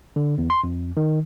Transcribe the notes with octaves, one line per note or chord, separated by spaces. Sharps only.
D3
E2
C6
F2
D#3